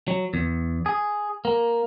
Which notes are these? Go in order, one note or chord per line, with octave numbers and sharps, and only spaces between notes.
F#3
E2
G#4
A#3